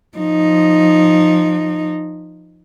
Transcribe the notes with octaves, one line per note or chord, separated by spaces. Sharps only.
F3 D#4